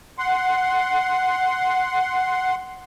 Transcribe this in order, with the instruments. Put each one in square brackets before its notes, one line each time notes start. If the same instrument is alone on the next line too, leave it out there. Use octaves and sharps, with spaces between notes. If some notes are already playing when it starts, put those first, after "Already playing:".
[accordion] F#5 C6